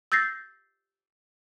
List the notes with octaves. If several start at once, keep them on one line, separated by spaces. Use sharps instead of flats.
E6 G6 A6 A#6 C7